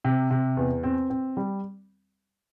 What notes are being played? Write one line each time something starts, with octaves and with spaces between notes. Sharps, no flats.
C3
C3
E2
C4
C4
G3